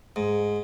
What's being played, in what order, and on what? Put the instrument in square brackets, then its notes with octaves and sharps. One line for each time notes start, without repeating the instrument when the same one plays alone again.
[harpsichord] G#2